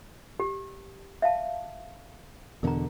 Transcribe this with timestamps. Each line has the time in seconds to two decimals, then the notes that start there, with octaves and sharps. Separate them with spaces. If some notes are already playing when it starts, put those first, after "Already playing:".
0.40 G4
1.22 E5 F5 A5
2.63 E2 B2 D3 A#4 A#5